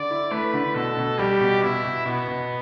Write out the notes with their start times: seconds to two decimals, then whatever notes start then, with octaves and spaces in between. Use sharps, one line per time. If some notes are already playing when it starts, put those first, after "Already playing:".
Already playing: D3 D5
0.11 E4
0.31 A3 B4
0.53 D3
0.75 B2 A4
0.97 B2
1.19 G3 G4
1.41 B2
1.63 B2 E4
1.85 B2
2.06 B2 B3
2.28 B2